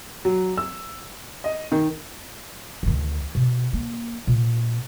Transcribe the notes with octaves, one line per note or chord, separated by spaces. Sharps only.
F#3
E6
D#5
D#3
D2 D#3
B2
A#3
A#2